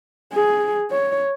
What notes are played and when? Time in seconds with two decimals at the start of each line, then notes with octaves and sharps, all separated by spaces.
0.33 G#4
0.91 C#5